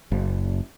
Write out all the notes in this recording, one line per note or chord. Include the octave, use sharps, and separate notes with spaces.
F#1